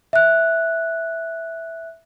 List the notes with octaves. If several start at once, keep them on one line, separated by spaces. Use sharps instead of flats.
E5 F#6